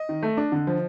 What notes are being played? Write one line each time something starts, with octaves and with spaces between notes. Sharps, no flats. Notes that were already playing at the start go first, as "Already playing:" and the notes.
Already playing: D#5
D#3
A3
D4
D3
F3